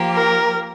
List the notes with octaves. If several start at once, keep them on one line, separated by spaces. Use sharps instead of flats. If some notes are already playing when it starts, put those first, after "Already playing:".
Already playing: F3 A#3 G4
A#4